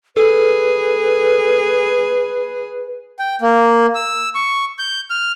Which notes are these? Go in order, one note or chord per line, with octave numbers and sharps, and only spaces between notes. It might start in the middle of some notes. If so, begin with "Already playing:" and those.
G#4 A4 B4
G5
A#3
E6
C#6
G6
F6